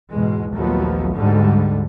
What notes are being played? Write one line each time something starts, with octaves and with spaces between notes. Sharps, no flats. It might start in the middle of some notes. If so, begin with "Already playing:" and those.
E2 G#2 B2 G#3
A#1 D#2 F3 F#3 A3 B3
D2 G#2 D3 G3